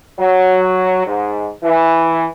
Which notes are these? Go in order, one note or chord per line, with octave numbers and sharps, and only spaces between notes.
F#3
G#2
E3